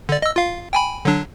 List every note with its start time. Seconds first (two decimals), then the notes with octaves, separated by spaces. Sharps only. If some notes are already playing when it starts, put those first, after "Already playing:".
0.09 D3 D5
0.22 D#5 E6
0.36 F4 F5
0.73 G5 G#5 B5
1.05 D3 F#3 D4